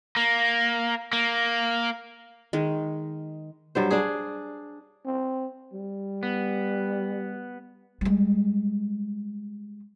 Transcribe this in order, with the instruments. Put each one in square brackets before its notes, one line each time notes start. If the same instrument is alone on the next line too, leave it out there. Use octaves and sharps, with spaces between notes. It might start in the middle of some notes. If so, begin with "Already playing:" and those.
[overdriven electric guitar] A#3
A#3
[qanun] D#3 G#3
[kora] G2 F#3 C5
D4 G#4
[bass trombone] C4
G3
[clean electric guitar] B3
[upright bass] G3 G#3